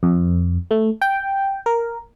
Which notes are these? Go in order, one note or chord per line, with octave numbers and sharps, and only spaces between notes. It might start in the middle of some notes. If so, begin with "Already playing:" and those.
F2
A3
G5
A#4